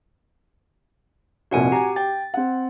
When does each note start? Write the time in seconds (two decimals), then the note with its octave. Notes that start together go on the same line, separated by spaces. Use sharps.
1.51 F1 C2 A#2 F#4 F#5 G#5
1.72 G4 G#5 A#5
1.96 G5 A6
2.34 C4 F#5